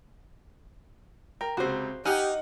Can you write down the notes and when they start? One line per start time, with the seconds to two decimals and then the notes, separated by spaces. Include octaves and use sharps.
1.41 A#4 G5
1.57 C#2 C3 F#4 C5
2.05 D#4 G4 F#5 G#5 F6 F#6